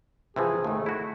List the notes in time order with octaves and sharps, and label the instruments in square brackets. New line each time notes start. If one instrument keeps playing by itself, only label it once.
[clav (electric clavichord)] C3 E3 F3 [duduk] G#4
[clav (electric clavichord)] D#2 G#2 [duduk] A3
[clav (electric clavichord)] E4 F#4